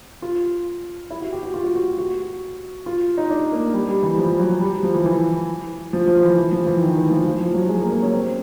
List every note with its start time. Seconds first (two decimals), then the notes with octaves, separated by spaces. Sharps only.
0.22 F4
1.11 E4
1.21 F#4
1.32 G4
1.43 F#4
1.54 F4
1.64 F#4
1.76 F#4
1.98 F#4
2.86 F4
3.18 D#4
3.30 D4
3.52 A#3
3.74 G3
3.89 G3
4.02 E3
4.18 F3
4.39 F#3
4.61 G3
4.83 F3
4.94 E3
5.05 E3
5.93 F3
6.07 F3
6.23 E3
6.37 E3
6.52 F3
6.67 E3
6.82 D#3
6.96 E3
7.10 F3
7.26 F3
7.40 F3
7.54 F#3
7.69 G#3
7.80 A#3
7.91 A#3
8.02 C#4
8.13 C4